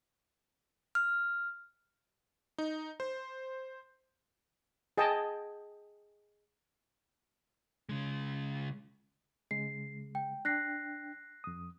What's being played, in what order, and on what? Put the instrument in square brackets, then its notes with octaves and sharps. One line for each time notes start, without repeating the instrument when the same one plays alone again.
[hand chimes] F6
[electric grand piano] D#4
C5
[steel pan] G#4 D#5 G5 A5
[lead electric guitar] C#3 G#3
[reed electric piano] C#3 G#3 [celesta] C7
[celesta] G5
[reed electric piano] D4 G5 [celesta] F#6 A#6 C7
[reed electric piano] F2 D#6